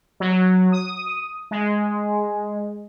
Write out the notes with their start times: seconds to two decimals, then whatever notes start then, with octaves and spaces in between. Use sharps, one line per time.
0.20 F#3
0.72 D#6
1.51 G#3